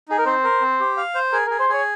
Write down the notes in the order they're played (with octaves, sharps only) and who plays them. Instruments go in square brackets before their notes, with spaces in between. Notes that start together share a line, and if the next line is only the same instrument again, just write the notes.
[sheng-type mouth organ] D#4 [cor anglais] G#4
[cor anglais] A#4
[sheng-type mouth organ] C4 [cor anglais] C5
[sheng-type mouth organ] A#4
C4
G4
F5
C5
[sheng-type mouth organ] G#4 [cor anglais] A#4
[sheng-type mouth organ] G#4 [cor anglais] A#4
[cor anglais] C5
[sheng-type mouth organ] G#4 [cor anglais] C#5